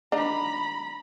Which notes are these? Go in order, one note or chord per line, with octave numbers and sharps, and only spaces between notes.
D4 D#4 A#5 B5